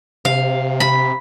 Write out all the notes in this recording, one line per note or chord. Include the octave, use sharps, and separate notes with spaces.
C3 F5
B5